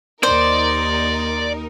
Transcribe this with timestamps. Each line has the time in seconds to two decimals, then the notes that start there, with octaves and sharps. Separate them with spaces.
0.23 D#2 D#4 A#4 C5 D5